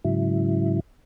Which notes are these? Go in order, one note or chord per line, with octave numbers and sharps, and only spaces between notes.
G#2 C#3 F#3 E4